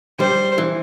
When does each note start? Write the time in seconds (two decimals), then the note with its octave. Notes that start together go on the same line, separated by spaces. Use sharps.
0.19 G3 C5
0.58 E3